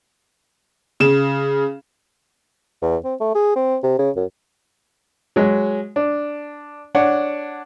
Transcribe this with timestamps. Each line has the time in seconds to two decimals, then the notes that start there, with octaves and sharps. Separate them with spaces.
1.00 C#3 E7
2.82 E2
3.04 C4
3.20 A3
3.35 G#4
3.56 C4
3.83 C3
3.99 C#3
4.16 F#2
5.36 F#3 G#3
5.96 D4
6.95 D4 C#5 F#5